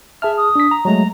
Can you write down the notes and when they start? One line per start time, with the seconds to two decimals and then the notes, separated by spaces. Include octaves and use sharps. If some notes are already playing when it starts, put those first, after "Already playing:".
0.22 G#4 E5 A5 F6
0.37 D#6
0.55 D4 B6
0.71 A#5
0.85 F#3 G#3 A3 A#5